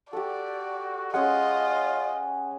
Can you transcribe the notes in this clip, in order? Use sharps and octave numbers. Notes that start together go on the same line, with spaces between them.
F#4 G4 A4 D5
G#3 C#4 F4 G#4 D#5 F#5